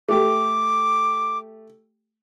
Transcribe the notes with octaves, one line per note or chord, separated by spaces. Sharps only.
A3 G4 D6